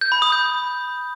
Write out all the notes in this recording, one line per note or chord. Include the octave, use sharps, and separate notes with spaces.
G6
B5
D#6
G6